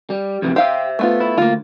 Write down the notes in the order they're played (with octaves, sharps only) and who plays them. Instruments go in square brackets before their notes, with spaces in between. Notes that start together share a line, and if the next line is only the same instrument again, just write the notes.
[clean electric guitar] G3
F2 C3 E3
[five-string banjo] G4 F5 [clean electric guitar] C5 E5
[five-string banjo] A3 B3 F4
[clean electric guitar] E4
[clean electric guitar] D2 [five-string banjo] A#3 F4